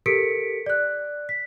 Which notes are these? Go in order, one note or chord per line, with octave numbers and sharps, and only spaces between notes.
G4 A4 A#4 B6 C#7 D7
D5 F#6
B6